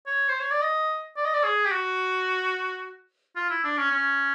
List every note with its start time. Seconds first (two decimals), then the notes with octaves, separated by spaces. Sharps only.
0.07 C#5
0.29 C5
0.40 C#5
0.51 D5
0.61 D#5
1.17 D5
1.25 D#5
1.34 D5
1.44 G#4
1.66 G4
1.72 F#4
3.36 F4
3.50 E4
3.64 D4
3.78 C#4
3.91 C#4